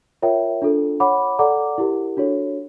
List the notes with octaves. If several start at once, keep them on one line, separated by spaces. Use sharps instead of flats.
F4 A#4 C#5 E5 G5
D4 F4 A4
C#5 F#5 B5 D6
A4 D5 F#5 A#5 D6
E4 G4 A#4
D4 F#4 A4 C#5